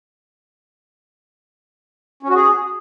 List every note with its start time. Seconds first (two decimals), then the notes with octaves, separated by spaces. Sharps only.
2.23 C#4
2.29 F#4
2.35 G#4